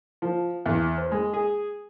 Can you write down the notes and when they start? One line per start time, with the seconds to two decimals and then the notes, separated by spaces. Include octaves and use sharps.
0.22 F3
0.66 E2
0.98 C5
1.12 G#3
1.34 G#4